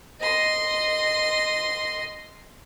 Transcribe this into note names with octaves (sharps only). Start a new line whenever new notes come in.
D#5 C6